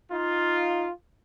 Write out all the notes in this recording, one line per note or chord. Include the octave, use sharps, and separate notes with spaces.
D#4 F4